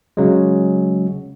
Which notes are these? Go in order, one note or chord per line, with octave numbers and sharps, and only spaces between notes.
C#3 F#3 G#3